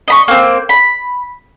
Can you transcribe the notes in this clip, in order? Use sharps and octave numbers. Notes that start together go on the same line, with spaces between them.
D#5 B5 C#6
A#3 C4
B5